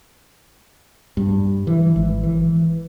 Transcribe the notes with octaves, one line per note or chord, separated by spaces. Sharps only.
G2
E3
G#1
E3